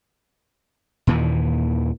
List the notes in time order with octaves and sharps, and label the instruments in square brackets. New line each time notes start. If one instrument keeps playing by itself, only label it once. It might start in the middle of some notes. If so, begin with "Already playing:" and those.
[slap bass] D#2 A#2 D#3 E3